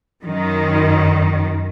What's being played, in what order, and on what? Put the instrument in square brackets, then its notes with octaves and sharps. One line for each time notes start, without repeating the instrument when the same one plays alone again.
[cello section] F#2 D#3